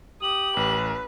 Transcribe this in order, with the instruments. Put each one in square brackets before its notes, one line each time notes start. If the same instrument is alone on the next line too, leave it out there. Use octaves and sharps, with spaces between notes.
[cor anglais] G4 [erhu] D#6 [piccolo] F#7
[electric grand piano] A1 [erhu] B4